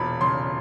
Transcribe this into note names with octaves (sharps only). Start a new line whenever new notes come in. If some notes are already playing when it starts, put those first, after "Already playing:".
Already playing: E1 A#2 B5
C#3 C6